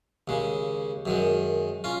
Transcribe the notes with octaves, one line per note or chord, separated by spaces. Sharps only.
D#2 C#3 G#3
F#2 D#3 G#3
C#4 F4